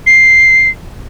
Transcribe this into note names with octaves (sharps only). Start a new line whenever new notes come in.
C7